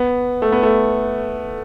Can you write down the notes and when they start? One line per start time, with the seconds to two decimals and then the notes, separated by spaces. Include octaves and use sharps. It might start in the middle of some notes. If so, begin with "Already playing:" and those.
Already playing: B3
0.42 A3
0.52 B3
0.63 A3